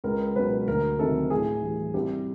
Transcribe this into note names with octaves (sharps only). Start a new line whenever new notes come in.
C#2 A#4
B2 F#3 B4
D2 A#4
C3 D#3 F#3 A4
A2 G#4
E3 G3
C2 G4